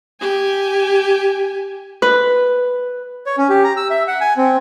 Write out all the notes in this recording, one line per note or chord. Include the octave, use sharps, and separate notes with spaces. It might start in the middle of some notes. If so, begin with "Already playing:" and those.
G4 G#5
B4
C#5
C#4
G4
A#5
E6
E5
F#5
G#5
C4